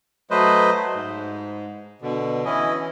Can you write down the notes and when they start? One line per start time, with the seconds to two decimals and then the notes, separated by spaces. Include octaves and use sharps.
0.31 F#3 A3 B4 C5 D#5
0.95 G#2
2.02 B2 D3
2.45 E3 C#4 E4 D#5